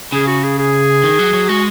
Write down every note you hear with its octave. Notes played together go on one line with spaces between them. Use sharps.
C#3 G#4
F#4
G#4
G#4
D#3
F#3
F#3
G#3 F#4